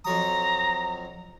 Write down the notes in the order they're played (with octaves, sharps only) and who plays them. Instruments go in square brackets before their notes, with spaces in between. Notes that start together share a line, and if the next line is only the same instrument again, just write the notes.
[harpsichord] F2 F#3 D#6 [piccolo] A#5